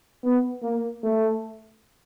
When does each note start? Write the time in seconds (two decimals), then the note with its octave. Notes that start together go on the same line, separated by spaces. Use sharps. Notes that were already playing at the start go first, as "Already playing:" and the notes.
0.24 B3
0.63 A#3
1.03 A3